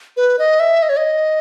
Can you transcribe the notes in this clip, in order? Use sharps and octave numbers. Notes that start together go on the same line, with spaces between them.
B4
D#5
E5
D#5
C#5
D#5